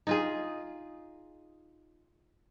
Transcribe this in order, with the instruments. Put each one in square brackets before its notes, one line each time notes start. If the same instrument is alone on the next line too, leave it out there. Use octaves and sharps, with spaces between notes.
[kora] D#4 F4 G#4